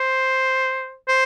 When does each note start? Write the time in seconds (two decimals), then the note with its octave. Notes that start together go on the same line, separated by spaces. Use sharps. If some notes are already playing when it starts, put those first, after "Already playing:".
Already playing: C5
1.08 C5